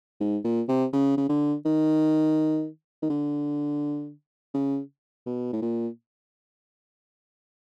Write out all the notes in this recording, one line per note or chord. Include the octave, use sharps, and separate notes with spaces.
G#2
A#2
C3
C#3
C#3
D3
D#3
D#3
D3
C#3
B2
A2
A#2